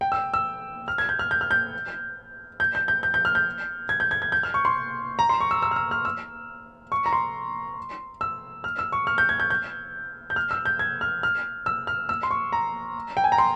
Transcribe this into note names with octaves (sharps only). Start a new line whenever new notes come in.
G5
E6
E6
F6
G#6
G6
F6
G6
F6
G6
G6
G6
G6
G6
G6
F6
G6
G#6
G6
G#6
G#6
G6
F6
C#6
C6
A#5
C6
C#6
E6
E6
F6
E6
F6
E6
C#6
A#5
C6
E6
F6
E6
C#6
F6
G6
G#6
G6
G6
G6
F6
E6
G6
G#6
F6
F6
E6
F6
E6
C6
C#6
A#5
G5
G#5
A#5
C6